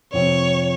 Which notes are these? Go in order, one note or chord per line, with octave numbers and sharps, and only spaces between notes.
F2 C3 F3 C4 C#5